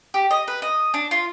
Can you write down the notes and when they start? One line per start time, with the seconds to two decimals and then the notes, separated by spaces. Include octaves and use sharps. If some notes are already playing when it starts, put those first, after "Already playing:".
0.14 G4
0.31 D#5
0.48 B4
0.62 D#5
0.94 D4
1.11 F4